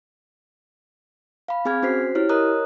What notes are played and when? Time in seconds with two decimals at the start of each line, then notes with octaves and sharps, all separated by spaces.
1.48 F5 B5
1.65 C4 G#4 G#5 F6 G#6
1.83 C#4 F#4 C5 B6 C7
2.15 E4 G4 C#5 F6
2.29 A#4 C#5 D#5 A#5 D#6 F#6